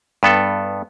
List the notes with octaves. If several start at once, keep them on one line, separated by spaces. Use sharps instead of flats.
G2 B3 A4